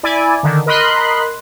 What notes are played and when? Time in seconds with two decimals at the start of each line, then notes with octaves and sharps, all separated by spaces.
0.03 E4 D5 G#5
0.43 D3 D#3
0.66 A#4 D#5 B5 C6 F#6